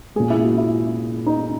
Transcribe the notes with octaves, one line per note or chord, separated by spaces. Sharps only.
A#2 G#3 G#4
E4
F#4
E4
D#4